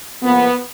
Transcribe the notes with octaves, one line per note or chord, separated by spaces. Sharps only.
F2 C#3 F3 A#3 B3